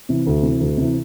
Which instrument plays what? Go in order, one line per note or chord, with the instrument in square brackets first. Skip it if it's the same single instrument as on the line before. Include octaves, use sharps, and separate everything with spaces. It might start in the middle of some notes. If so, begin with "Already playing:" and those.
[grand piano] C3 E3
D2
C3 E3
D2
C3 E3